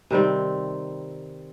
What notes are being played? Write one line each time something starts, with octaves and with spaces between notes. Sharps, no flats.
C3 D#3 G3 C4